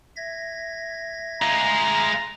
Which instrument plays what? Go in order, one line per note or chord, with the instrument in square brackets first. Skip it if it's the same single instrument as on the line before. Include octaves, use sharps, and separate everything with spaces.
[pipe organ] E5 G#6 A#6
[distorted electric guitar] G#3 F4 [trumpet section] A#5